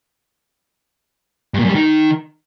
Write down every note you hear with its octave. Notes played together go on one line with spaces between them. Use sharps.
G2
A#2
F#2
G3
D#3